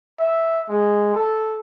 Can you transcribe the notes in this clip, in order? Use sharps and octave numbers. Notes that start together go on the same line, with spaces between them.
E5
G#3
A4